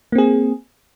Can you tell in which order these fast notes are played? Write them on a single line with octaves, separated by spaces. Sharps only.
A#3 C4 G#4